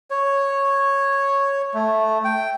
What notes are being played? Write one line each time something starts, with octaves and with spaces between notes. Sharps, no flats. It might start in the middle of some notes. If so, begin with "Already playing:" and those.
C#5
A3
G5